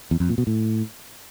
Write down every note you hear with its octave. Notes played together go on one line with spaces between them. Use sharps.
E2
F2
A#2
B2
A2